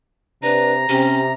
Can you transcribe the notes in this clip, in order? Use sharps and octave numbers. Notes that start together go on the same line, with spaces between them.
C3 D4 B4 A#5
C3 C#4 G4